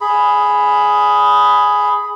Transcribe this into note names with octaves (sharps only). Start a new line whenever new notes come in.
G#4 B5